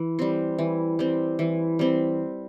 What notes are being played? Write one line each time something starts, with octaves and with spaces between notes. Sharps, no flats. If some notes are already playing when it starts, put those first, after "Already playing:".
Already playing: E3
G3 C4
E3
G3 C4
E3
G3 C4